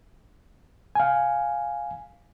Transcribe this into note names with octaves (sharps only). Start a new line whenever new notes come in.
F5 G#5